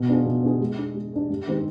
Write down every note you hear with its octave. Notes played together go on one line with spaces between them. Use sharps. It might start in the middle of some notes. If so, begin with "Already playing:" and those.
Already playing: B2
B3 D4 F4 G#4
B2
B3 D4 F4 G#4
G#3
D4 G#4
G#3
D4 G#4
G2
D#3 G#3 C4 G4